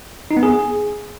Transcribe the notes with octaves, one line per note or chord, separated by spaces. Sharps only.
D#4
B3
G#4